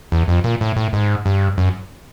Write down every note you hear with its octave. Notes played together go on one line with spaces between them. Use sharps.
E2
F2
A#2
A2
A2
G#2
G2
F#2